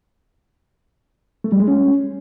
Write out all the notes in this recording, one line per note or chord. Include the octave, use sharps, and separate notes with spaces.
A3
G3
G#3
C#4